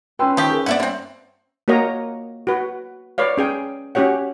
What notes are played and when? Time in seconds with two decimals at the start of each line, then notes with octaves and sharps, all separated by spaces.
0.19 C#4 B4 G5 C6 E6
0.37 D#3 F3 G4 C#6 D#6
0.50 G#4 A#4
0.66 G2 B3 C4 D5 E5 F#5
0.80 A#3 C4 C#4 E5
1.68 A#3 F#4 A#4 C#5 D#5 A#5
2.47 F#4 B4
3.18 B4 C#5 D5 F5
3.37 C#4 G#4 G5
3.95 C#4 F#4 G4 C#5 F#5